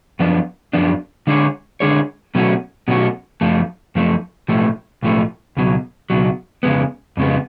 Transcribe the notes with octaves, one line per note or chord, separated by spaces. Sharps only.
F#2 F3 B3 D4
F#2 F3 B3 D4
D3 G#3 D4 G#4 C#5
D3 G#3 D4 G#4 C#5
B2 F#3 A3 C#4 F#4
B2 F#3 A3 C#4 F#4
F#2 F3 A3
F#2 F3 A3
B1 A2 F3 A3
B1 A2 F3 A3
C#2 B2 F#3
C#2 B2 F#3
F2 C#3 G#3 B3
F2 C#3 G#3 B3